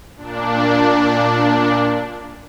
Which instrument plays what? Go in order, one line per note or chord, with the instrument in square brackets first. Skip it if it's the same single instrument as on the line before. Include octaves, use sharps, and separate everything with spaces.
[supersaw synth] A#2 D4